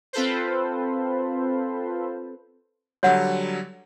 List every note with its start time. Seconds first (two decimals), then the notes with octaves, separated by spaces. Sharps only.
0.13 C4 F4 A4 B4 C5
3.03 D3 F#3 G3 C#5 F#5